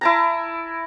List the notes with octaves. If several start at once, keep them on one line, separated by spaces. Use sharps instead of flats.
E4 A5 A#5